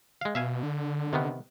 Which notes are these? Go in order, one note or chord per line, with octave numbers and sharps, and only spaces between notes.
G#3 F5
B2 E5 F5 G#5
D3
C3 D#3 B3